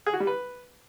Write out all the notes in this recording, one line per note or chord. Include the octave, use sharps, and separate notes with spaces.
G#4
F#4
G3
B4